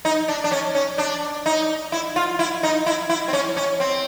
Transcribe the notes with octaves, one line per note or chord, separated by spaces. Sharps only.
D#4
D4
D4
C#4
C#4
D4
D#4
E4
F4
E4
D#4
E4
E4
C4
C#4
C#4
C4